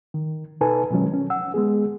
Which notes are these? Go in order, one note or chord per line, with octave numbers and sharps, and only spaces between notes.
D#3
B2 D#4 A4 B4 G#5 A5
B2 D#3 F3 F#3 G#3 C#4
C#4
F#5 E6
G#3 B3 G#4